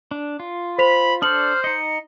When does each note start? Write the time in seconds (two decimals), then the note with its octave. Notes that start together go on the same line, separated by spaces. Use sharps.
0.11 D4
0.40 F4
0.78 C5 B5 B6 F7
1.22 D4 A4 C5 D5 D#6 F6 F#7
1.64 D#4 D#5 C#7